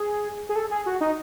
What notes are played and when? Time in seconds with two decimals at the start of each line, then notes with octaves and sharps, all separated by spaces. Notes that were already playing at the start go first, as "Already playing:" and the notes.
Already playing: G#4
0.49 G#4
0.56 A4
0.71 G#4
0.86 F#4
1.01 D#4